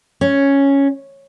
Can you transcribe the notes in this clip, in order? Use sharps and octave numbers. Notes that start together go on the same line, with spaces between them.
C#4